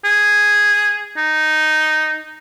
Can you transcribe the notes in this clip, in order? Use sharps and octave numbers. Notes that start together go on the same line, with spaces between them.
G#4
D#4